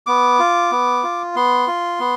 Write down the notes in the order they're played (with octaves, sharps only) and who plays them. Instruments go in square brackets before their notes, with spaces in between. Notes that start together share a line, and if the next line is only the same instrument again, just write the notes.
[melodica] B3 D6
F4
B3
F4
B3 C6
F4
B3